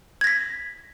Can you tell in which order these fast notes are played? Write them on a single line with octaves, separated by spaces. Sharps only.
G#6 A#6 B6